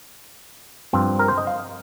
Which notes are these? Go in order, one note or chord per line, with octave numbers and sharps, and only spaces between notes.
G2 F3 C4
A#4
C5
D#5
F5